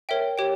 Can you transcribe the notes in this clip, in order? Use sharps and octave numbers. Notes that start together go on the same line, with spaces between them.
A#4 C#5 E5 G5
G4 C#5 G5